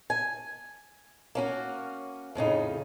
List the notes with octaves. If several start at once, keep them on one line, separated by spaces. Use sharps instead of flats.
G#5
A#3 C#4 F#4
F2 A2 C#3 D#4